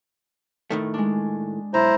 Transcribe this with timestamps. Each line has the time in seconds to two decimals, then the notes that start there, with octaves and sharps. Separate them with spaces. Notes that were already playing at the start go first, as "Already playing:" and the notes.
0.70 A2 D#3 A3
0.94 G#3 D4
1.74 B1 E4 C5 A#5